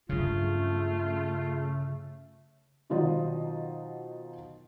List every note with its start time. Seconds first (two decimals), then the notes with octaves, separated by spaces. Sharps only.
0.09 G2 C#3 F#3 A3 F4
2.90 B2 D#3 F#3 F4 C5 D#5